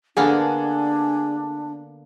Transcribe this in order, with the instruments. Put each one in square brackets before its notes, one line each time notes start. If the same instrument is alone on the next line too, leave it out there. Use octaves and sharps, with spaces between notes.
[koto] D3 A#3 B3 [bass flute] D4 [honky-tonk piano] G#4 A4